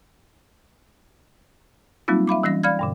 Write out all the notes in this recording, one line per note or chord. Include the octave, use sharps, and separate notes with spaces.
F#3 G3 A#3 C4 D#4 F4
E5 F5 B5 D6
E3 G3 C#4 A#6
D5 F5 B5 F6 G#6
G2 B2 D3